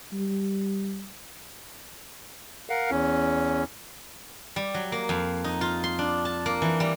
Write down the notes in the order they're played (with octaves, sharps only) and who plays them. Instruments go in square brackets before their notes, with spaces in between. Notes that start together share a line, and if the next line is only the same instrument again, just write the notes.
[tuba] G3
[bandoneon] A#4 F5 F#5
E2 C#4
[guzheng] G3
F#3
A#3
F2
D#4
F4
C6
D4
A5
A#3
E3
G3